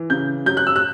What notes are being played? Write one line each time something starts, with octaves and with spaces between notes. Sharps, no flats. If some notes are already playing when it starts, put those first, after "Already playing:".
Already playing: E3
C#3 G6
F#3 G6
F#6
E6
F#6